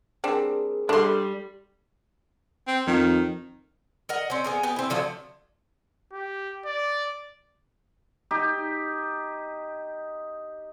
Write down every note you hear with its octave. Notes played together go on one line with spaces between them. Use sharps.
G3 C4 D4 G#4 A#4
G3 D4 A4 C6
C4
F2 D#3
A#4 D#5 F#5
C4 C#4
B3 G#4 A#4
B3 G4 G#4
C4 E4
D3 F3 F#3 A3
G4
D5
D#4 G4